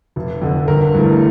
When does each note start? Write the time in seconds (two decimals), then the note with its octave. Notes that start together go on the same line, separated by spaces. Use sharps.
0.16 F1
0.42 F2 D3
0.68 G1 A#4
0.94 G2 E3 A3